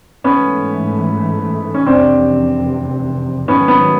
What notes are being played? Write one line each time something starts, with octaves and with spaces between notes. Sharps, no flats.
G#2 E3 A3 B3 C#4
C#4
F1 E2 C3 C4 D4
G#2 D#3 F#3 A3 B3 C#4
B3 C#4